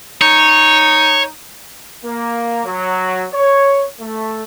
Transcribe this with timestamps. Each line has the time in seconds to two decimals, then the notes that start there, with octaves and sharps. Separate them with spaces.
0.21 D#4 C#5
2.04 A#3
2.64 F#3
3.33 C#5
4.00 A3